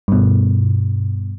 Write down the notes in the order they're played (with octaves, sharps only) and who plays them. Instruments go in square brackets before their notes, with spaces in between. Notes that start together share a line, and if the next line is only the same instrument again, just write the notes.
[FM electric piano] G2 B2